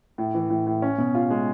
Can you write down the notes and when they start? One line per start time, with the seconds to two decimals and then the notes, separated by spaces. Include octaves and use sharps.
0.18 A2
0.34 E3
0.50 A2
0.66 A2
0.82 C#4
0.98 B2
1.15 F4
1.30 G#3